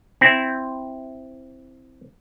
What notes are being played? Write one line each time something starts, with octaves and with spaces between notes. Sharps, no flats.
C4 E4